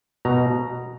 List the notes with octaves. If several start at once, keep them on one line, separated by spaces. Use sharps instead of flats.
B2 A#5